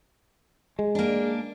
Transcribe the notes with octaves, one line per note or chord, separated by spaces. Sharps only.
G#3
A#3 D4